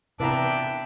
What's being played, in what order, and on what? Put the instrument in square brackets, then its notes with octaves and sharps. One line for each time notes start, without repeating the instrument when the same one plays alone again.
[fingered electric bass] C3 [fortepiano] E3 B3 A#5 [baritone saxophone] D4 [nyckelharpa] E5 G5